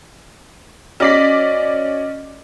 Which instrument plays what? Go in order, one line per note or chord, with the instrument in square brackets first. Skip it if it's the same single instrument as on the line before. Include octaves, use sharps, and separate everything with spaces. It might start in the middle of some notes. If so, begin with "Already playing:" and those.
[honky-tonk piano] C#4 D5 B6 [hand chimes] F#4 D#5 A#6